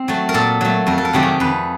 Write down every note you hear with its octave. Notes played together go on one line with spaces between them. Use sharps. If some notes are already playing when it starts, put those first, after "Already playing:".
Already playing: C4
F#3 A3
A#4
A#2 A4
F#3 A3
F2 A#4
A4
A#4
C3 D#3 F#3 A3 G4
G#4
F2 B4